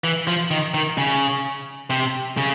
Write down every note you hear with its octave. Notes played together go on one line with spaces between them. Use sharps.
E3
F3
D#3
D#3
C#3
C3
C#3